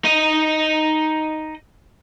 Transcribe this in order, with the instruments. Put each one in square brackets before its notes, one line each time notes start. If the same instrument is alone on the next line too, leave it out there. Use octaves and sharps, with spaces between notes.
[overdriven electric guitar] D#4 D#5